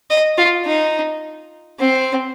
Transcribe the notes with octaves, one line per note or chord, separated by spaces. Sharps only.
D#5
F4
D#4
C4